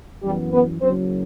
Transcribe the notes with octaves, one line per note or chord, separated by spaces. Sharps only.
F#2 E3 G3 B3 G4
B3 B4
F#1 F#2 F#3 C4 C5